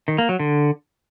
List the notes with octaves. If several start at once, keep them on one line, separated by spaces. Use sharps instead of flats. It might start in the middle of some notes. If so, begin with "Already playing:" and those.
D#3
A#3
F#3
D3